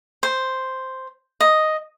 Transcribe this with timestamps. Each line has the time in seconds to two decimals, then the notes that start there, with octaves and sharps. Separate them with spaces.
0.23 C5
1.41 D#5